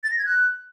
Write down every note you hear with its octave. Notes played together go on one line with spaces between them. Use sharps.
A6
A#6
G#6
F#6